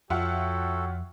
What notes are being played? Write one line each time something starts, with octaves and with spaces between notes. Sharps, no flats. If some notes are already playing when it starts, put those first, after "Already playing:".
F2 F4 F#4 A4 C#5 E5 F#5 G5